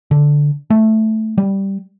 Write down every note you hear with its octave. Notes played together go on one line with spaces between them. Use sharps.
D3
A3
G3